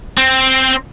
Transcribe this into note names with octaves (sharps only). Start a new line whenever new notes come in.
C4